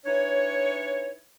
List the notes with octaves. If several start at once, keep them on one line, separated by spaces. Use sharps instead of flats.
E3 D4 D#4 C#5